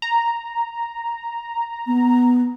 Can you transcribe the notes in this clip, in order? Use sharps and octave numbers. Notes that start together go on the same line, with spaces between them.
A#5
B3